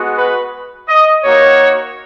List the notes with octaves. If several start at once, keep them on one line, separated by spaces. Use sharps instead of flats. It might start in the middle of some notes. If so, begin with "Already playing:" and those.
Already playing: G#3 B3 F#4
B4
D#5
A#3 D#4 F#4 C#5